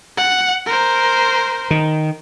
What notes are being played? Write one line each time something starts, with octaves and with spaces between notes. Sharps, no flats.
F#5
A#4 C5
D#3